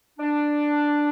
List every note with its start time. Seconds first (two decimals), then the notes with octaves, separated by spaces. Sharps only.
0.19 D4